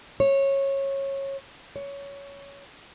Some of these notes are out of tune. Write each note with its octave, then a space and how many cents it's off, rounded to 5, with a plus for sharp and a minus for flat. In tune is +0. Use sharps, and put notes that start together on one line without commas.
C#5 -20
C#5 +15